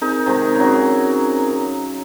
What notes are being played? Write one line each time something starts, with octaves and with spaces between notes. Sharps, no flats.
C4 D#4 G#4 A#4
C3 D#3 G#3
C#3 F#3